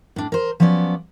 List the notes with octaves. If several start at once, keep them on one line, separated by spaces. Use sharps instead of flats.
A2 D4
A#4 C5
F3 F#3 B3 C#4 D5